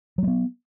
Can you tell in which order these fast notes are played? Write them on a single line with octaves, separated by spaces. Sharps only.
F#3 A3 B3